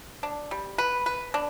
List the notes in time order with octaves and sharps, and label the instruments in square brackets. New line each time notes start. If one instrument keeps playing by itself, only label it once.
[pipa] D4
G3
B4
B4
D4